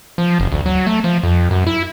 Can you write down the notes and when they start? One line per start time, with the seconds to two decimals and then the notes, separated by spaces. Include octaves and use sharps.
0.18 F3
0.40 F#1
0.52 D2
0.66 F#3
0.87 A3
1.04 F3
1.23 F2
1.51 F#2
1.67 E4